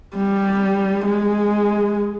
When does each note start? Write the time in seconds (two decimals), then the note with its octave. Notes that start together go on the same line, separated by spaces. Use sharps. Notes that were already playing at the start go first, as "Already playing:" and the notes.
0.15 G3
1.05 G#3